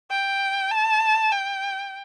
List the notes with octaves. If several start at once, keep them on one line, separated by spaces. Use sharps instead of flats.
G5
A5
G5